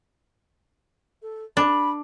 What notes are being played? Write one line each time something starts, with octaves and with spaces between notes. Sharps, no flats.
A4
D4 B5